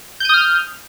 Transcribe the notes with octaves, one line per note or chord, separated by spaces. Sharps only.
D#6 F6 G6 D#7